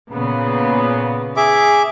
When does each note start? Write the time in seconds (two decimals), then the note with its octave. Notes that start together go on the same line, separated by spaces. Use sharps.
0.11 A#2 C#3 B3
1.37 G#4 E5 D6